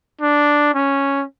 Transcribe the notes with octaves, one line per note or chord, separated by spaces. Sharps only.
D4
C#4